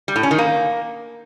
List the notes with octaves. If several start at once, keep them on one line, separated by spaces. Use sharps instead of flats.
G3
A2
C#4
D#3
A#3